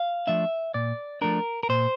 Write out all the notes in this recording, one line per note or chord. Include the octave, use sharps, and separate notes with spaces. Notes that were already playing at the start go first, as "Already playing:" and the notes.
Already playing: F5
F3 A3 D4 E5
A#2 D5
F3 A3 D4 A#4
A#4
A#2 C5